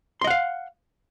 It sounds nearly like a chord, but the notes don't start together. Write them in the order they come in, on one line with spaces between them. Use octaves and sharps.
C6 D#5 F#5 F5